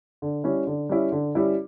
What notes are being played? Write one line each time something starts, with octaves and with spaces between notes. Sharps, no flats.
D3
G3 C#4 E4
D3
G3 C#4 E4
D3
G3 C#4 E4